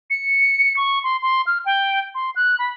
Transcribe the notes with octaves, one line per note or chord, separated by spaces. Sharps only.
C#7
C#6
C6
C6
F6
G5
C6
F#6
B5